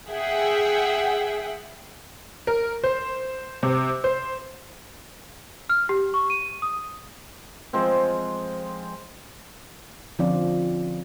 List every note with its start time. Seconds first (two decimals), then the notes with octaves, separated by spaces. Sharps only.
0.10 G#4 E5 F#5 G5
2.47 A#4
2.84 C5
3.63 C3
4.04 C5
5.69 F6
5.89 G4
6.14 C#6
6.30 D#7
6.62 D#6
7.73 F3 G#3 C4
10.19 D3 F3 C4 C#4 F4 D5